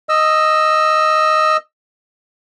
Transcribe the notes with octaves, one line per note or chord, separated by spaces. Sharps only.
D#5 E6